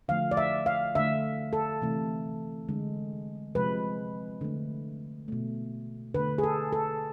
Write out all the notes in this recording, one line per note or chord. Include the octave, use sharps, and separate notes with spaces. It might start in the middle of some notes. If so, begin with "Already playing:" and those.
D3 F3 A3 F5
D5
E5
F5
D3 A3 E5
A4
C3 E3 A3
D3 G#3
C3 F3 G#3 B4
D3 A3
B2 A3
D3 A3 B4
G#4
A4
A4